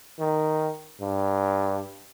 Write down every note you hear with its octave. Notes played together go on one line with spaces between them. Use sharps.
D#3
G2